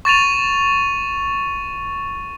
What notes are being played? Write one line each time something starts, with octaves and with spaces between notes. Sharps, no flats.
C#6 A6 D#7 F7